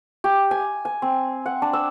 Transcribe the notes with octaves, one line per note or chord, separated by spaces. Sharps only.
G4
G#5
G#5
C4
F#5
D4
E6